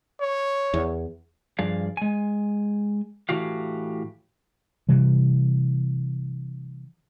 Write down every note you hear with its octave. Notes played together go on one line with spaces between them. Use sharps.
C#5
E2
G2 F3 G#4 D5 F5
G#3 G#5
A2 E3 F#4 G4 F5
C3 E3 G3